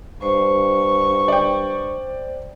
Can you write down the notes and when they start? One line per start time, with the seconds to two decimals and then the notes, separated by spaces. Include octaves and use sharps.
0.22 G2 C5 C#6
1.28 D5 G5